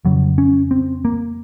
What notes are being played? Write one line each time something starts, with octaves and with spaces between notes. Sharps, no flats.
F2 C#3 F#3
C#4
C4
A#3